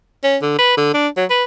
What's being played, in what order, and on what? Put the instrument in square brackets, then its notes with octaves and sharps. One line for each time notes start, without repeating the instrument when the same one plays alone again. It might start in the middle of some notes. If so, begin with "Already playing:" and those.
[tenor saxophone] C#4
D3
B4
D3
D4
F#3
B4